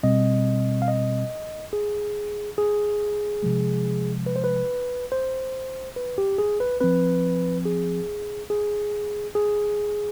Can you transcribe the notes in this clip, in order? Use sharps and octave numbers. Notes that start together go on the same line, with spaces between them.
B2 G3 C4 D#5
F5
D#5
G#4
G#4
C3 F3 G#3
B4
C5
B4
C5
B4
G4
G#4
B4
F3 C4 B4
G#4
G#4
G#4